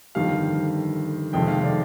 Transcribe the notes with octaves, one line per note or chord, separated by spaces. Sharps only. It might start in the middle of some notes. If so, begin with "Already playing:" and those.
G1 F2 D#3 G3 F5
F1 F2 C3 D#3 G#3 G5
F5
D5